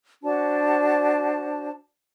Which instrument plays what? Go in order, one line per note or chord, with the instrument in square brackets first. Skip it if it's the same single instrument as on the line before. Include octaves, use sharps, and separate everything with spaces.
[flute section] D4 F#4 C5 A5